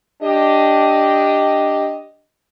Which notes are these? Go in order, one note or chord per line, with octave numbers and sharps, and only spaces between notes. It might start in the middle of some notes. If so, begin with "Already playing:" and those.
D4 G4 D#5